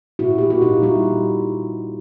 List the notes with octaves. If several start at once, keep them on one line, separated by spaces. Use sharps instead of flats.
A#2 E4 F#4
A#3 G4
F#4
A#2 D#4 F4
G3 E4 F#4